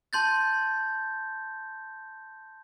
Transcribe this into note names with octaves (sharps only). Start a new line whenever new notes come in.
A5 C6 G6 A6